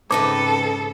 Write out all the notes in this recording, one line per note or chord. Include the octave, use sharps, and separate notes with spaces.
G#2 C#3 C4 D#4 A4 B4 D6